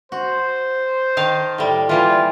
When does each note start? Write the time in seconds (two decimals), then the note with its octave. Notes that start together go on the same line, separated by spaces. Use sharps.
0.12 F#4 C5
1.17 D#3 F5 A5
1.58 A2 G3
1.89 E3 G3 A#3 F4